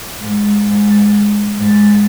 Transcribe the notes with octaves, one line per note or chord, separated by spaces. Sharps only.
G#2
G#2
G#2